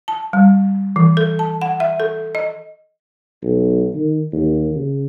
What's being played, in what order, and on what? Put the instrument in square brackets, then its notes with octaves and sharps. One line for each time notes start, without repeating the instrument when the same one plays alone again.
[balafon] A5
G3
E3
A4
A5
F#5
E5
A4
D#5
[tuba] B1
D#3
D#2
C#3